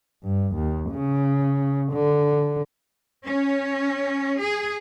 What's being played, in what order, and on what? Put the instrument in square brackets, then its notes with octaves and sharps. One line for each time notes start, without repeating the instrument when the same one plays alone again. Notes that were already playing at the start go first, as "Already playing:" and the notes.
[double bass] G2
D#2
C#3
D3
[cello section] C#4
G#4